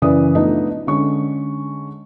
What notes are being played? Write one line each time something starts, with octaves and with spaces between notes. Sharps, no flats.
F#2 C#3 E3 B4 D5 D#6
F3 A3 B3 D4 D#4
D3 G#3 C#4 C#6